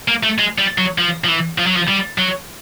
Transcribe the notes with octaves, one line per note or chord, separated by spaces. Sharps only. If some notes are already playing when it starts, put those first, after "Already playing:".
A#3
A3
G#3
G3
F#3
F3
F3
E3
F3
F#3
F3
G3
F#3